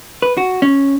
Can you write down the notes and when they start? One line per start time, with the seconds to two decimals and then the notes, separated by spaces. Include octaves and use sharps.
0.22 B4
0.37 F#4
0.62 C#4